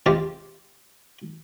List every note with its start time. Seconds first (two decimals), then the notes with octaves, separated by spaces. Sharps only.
0.06 G#3 C4 F4 G4